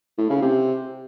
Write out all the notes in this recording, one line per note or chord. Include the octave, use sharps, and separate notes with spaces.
A2
C#3
C3